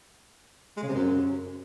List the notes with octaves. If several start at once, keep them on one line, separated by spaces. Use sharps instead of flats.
G#3
C#3
C3
F#2